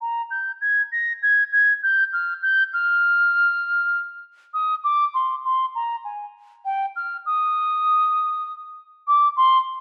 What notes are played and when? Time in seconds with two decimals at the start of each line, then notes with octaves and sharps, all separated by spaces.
0.01 A#5
0.30 G6
0.61 G#6
0.91 A#6
1.22 G#6
1.52 G#6
1.83 G6
2.12 F6
2.42 G6
2.73 F6
4.53 D#6
4.83 D6
5.14 C6
5.44 C6
5.75 A#5
6.04 G#5
6.65 G5
6.96 F6
7.25 D#6
9.07 D6
9.36 C6